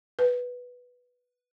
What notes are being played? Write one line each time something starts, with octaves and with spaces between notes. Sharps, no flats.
B4